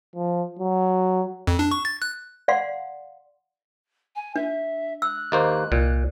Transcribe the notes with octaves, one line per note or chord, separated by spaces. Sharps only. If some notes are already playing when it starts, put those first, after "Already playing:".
F3
F#3
F2
D4
C#6
A6
F#6
D5 F5 F#5 C6
G#5
D4 E5
E6 F#6
D#2 A#3 C5 D#5
C2 A#2